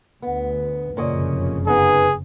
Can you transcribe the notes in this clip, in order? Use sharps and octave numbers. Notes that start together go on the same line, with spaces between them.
D2 B3
F1 F#2 A#2 C#3 C#4 D#5
B3 D#4 G#4